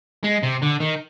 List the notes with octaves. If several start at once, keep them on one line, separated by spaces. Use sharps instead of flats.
G#3
C3
D3
D#3